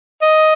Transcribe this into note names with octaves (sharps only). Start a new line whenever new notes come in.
D#5